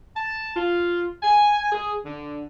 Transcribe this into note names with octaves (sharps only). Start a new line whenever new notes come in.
A5
F4
G#5
G#4
D3